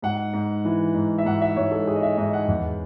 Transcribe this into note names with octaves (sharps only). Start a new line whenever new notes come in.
G#2 F#5
G#2
E3
G#2
E5
G#2 F#5
E5
G#2 C#5
A4
G#2 G#4
D#5
E5
G#2 D#5
F#5
E2